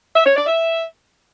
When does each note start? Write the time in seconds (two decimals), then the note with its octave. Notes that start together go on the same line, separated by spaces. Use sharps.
0.16 E5
0.26 C#5
0.36 D5
0.46 E5